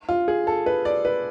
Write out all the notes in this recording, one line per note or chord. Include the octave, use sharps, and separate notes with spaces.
F4
G#4
A4
B4
D5
B4